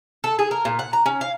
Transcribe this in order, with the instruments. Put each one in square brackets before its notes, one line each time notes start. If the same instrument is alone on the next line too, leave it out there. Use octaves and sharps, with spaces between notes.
[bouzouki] A4
G#4
A#4
A#2
F#5
A#5
C#4
F5